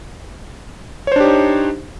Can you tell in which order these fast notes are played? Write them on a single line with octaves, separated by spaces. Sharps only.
C#5 C5 D4 G4 D#4